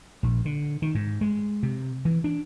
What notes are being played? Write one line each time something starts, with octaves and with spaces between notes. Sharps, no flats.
A#1
D3
D#3
G#2
G#3
C3
E3
D4